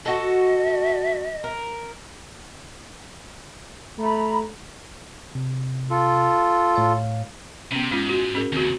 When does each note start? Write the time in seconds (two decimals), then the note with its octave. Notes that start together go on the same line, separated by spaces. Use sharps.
0.06 F#4 A4 D#5
1.44 A#4
3.99 A3 A#5 B5
5.35 C3
5.90 F4 A4
6.76 A2 C#5 F5
7.72 C3 B3 C#4
7.91 G#2 G#3 C#4 F4
8.09 F#4
8.35 C#4 G#4 A#4
8.52 D#2 C#3 C4 F#4